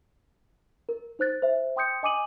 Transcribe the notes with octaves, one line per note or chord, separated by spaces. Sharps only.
A#4
D#4 C5 F#6 A6
C5 E5
G5 C6 D#6 G6 C#7
D#5 G#5 D6 D#6 D#7 F#7